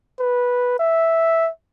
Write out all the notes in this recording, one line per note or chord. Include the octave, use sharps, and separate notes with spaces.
B4
E5